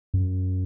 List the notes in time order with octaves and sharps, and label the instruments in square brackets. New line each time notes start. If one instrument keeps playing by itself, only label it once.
[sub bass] F#2